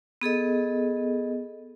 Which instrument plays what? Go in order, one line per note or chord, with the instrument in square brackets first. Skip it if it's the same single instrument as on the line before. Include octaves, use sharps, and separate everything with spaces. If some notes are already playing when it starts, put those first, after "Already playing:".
[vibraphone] B3 G#4 A4 D#5